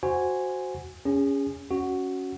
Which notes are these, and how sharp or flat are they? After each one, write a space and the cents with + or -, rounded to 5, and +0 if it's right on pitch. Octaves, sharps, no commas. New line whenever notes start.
F#4 +0 C5 +0 G#5 -5
C#4 +15 G#4 -30
C#4 +0 F#4 +0